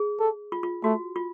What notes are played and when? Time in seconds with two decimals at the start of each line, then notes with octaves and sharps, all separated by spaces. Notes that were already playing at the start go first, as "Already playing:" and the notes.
Already playing: G#4
0.19 A4
0.52 F4
0.63 F4
0.84 A3 F#4
1.16 F4